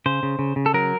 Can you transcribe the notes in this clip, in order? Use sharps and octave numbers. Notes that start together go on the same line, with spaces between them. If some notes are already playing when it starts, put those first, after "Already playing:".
C#3 C5
C#3
C#3
C#3
A4
F#3 A#4